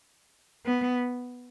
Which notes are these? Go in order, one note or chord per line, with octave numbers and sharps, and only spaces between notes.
B3